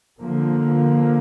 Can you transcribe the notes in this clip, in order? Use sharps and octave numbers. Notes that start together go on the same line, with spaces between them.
D3 F3 A#3